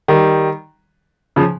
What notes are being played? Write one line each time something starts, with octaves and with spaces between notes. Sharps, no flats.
D#3 G3
C#3 F3